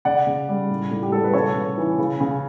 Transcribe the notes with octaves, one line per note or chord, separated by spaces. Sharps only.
C#3 D5 F#5
C#3
G3
A2
A2
G4
G3 A4
B4
C#3 A4 C#5
C#3
E3
C#3
C#3